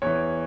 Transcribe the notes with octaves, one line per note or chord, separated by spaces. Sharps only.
E2 E3 C#5